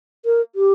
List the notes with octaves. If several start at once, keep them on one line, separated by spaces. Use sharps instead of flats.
A#4
G4